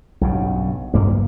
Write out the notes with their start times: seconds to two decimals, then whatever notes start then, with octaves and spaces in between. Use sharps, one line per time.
0.21 B1 G2 C#3
0.94 F#1 G2 A#3